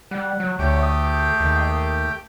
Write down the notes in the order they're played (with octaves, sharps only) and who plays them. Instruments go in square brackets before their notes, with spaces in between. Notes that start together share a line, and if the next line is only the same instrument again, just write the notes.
[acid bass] G3 [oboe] F#5
[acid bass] F#3
[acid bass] D2 [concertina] A3 G4 G5 [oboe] C#5
[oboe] D#6
G#4
[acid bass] D#2